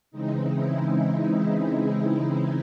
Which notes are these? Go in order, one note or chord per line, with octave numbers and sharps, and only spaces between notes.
C#3 E3 G#3 C4 D#4
E4
D#4